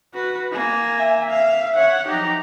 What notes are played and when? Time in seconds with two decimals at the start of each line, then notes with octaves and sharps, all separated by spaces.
0.14 F#4 B4
0.52 A#3 G#5
0.99 E5
1.31 F5
1.76 C#5 F#5
2.08 F3 F#3 D#4 G4 A#5